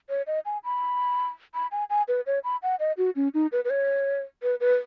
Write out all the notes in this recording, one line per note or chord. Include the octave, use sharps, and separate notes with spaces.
C#5
D#5
G#5
B5
B5
G#5
G#5
B4
C#5
B5
F#5
D#5
F#4
C#4
D#4
B4
B4
C#5
B4
B4